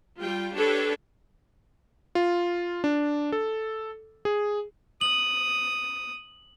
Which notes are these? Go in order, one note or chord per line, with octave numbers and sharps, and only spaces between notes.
G3 F4 G5
D4 G4 A4 B4 C#5
F4
D4
A4
G#4
D#6 F#7